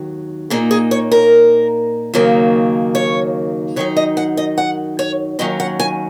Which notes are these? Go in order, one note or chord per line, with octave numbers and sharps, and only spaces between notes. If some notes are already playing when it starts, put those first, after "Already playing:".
Already playing: D#2 D#3 F#3
A#2 A#3 D#4 G#4
G#4
C#5
A#4
D#2 C#3 F#3 A#3 D#4
C#5
F#2 D#3 F#3 D#4 C#5
D#5
F#5
D#5
F#5
C#5
D#2 D#3 F#3 C#4 D#5
F#5
G#5